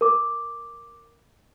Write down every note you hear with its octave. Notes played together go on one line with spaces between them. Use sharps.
A#4 D6